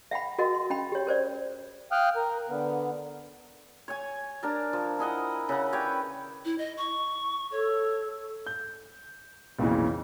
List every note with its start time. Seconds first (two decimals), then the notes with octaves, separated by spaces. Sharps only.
0.11 E5 F#5 G5 B5
0.38 F#4 A#4 D#5 F#5 C6
0.55 C6
0.70 C#4 G5 B5
0.92 G4 C#5
1.07 A#4 C5 D5
1.92 F5 G5 D#6 F6 F#6
2.16 A#4
2.49 D3 B3
3.88 C#5 G#5
4.43 D4 A#4 A5
4.73 F3
4.99 E4 G#4 D#5 F#5
5.49 C#3 E5 F#5
5.73 B4 C#5 D5 G5
6.45 E4
6.58 D#5
6.77 C#6
7.52 A4 C#5
8.46 G6
9.59 B1 F2 A#2 C#3 E3